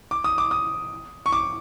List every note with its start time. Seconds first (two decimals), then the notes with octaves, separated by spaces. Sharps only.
0.11 D6
0.24 D#6
0.38 D6
0.51 D#6
1.26 C#6
1.33 D6